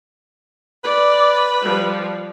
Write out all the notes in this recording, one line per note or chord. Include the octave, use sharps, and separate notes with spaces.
B4 D5
F3 G3